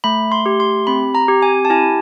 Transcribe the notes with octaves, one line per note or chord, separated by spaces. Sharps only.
A3 B5
C6
G4
C6
C4 B5
A#5
G4
G#5
A5
E4 G#5